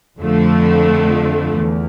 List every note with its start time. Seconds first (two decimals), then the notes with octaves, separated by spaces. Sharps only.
0.18 F2 D3 F3 A3
1.57 E2